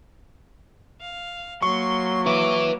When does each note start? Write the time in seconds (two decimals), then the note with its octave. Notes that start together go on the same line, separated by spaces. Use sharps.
1.01 F5
1.62 F#3 A#3 C6 C#6
2.26 B4 E5 D6